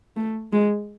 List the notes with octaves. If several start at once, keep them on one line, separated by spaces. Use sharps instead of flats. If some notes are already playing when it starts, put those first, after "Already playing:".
A3
G#3